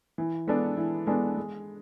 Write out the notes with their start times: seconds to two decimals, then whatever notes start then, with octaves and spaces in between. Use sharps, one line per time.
0.18 E3
0.47 G#3 B3 D4 A4
0.77 E3
1.07 G#3 B3 D4 A4
1.36 G#3